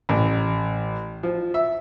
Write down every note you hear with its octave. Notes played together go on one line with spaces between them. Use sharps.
A1
F3
E5